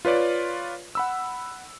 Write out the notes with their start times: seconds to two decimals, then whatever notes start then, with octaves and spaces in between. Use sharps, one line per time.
0.05 F4 B4 C#5 D5
0.95 F#5 B5 E6